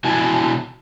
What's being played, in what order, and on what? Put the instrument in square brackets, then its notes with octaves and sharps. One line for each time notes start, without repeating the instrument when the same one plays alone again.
[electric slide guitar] B2 E4 F#4 G#5 A5